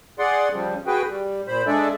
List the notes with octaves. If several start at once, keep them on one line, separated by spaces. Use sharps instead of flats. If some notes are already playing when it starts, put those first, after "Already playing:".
G#4 D5 F#5 C6
C#3 F3 G3
F#4 G#4 B4 G5
G3
A#2 C5 B5
G#3 D4 G#4 A4 D5 E5